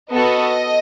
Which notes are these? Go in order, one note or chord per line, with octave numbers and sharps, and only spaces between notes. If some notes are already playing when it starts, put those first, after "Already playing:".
B3 F#4 A4 D#5